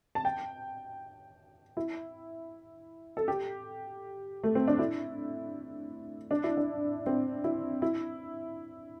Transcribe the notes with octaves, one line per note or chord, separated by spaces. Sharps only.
A5
G5
E4
A4
G4
A3
C4
D4
E4
D4
E4
D4
C4
E4
E4